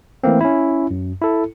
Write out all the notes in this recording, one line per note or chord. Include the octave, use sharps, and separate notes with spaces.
E3 A3 A#3 C4
C#4 E4
F#2
E4 A4